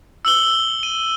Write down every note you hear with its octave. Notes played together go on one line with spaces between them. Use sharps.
E6 F#7 G7
D#7